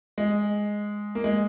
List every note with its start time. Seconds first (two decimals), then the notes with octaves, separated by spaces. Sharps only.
0.18 G#3
1.15 A#3
1.24 G#3